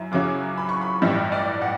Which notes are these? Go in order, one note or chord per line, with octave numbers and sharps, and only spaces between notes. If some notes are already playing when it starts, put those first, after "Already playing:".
Already playing: F#2 E4
F#2 C#3 F#3 C#4 E4 D6
B5
C#6
B5
A1 G2 E3 G3 E5
D5
F#5